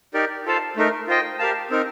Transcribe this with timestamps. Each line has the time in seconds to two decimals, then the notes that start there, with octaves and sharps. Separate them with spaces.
0.14 D#4 G4 A#4 D5
0.46 F4 A4 C5 F5 A5
0.77 A3 D#4 A#4
1.07 F4 C5 D#5 G5
1.39 G4 A#4 F5 A5
1.71 C4 D#4 A#4